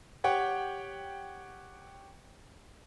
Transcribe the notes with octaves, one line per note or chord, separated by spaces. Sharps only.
G4 C#5 F#5 G5